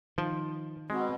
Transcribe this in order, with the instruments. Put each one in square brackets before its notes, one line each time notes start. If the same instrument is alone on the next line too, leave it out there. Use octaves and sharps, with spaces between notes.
[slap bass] D#3 [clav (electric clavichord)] F3
[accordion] B2 [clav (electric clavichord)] G#3 [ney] C4